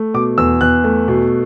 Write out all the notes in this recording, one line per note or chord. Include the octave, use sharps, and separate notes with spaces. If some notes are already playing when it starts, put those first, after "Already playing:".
Already playing: A3
B2 D6
E2 E6
E2 F#6
A3
B2